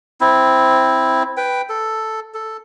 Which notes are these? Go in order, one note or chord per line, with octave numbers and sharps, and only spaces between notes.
C4 E4
B4 G5
A4
A4